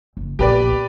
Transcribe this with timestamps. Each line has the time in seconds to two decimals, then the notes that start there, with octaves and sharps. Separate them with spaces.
0.17 F#1
0.39 A#1 B3 G4 B4 D5